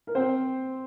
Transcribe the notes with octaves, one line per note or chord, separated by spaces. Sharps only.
A#4
C4 C5